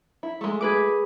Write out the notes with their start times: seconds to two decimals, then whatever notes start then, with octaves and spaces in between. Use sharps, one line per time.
0.23 E4
0.41 G#3 A3
0.61 G#4 B4 D6